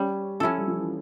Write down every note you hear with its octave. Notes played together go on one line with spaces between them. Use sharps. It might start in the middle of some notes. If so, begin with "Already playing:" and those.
Already playing: G3 C#4
F3 C#4 E4 A4
G3
F3
E3